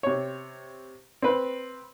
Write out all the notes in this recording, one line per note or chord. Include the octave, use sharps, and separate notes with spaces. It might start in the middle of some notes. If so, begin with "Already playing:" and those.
C3 C#5
C4 B4